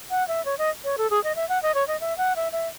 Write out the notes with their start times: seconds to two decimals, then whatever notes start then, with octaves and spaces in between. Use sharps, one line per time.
0.11 F#5
0.28 E5
0.45 C#5
0.58 D#5
0.84 C#5
0.98 A4
1.10 G#4
1.24 D#5
1.36 E5
1.49 F#5
1.63 D#5
1.75 C#5
1.88 D#5
2.01 E5
2.18 F#5
2.36 E5
2.52 E5